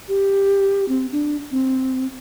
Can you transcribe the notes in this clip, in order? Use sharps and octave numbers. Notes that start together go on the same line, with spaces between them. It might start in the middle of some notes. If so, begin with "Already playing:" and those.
G4
C4
D4
C4